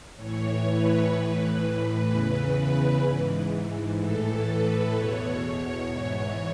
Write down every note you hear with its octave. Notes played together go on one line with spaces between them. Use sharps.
A2 E3 C#5
B4
A2 E3
E2 C#3 E3 B4
G#2 E3
A2 E3 A4
B4
E2 B2 C#5
C#5
G#2 E3 C#5